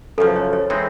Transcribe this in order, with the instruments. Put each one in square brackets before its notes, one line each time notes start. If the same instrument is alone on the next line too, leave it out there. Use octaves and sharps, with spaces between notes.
[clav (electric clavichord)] F#2 C#3 F3 [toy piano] A4
[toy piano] C5
C#5
C#5
[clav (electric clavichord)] E3 G#3 C4 D#4